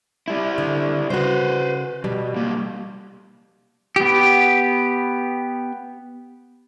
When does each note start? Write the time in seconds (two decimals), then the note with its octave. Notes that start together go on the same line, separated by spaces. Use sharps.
0.28 G3 E4
0.58 D3
1.10 C#3 F#4 B4 C5
2.04 B2 G3
2.35 B1 A#3
3.96 B3 G4